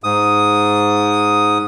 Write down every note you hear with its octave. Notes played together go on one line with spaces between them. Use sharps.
G#2 D#6